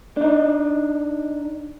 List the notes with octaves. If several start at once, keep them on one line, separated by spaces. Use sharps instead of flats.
D4 D#4